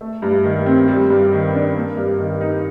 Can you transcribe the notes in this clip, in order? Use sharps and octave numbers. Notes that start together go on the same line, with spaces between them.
A3
G2
D#3
C4
G3
G2
D#3
D4
A#3
G2
D#3
D#4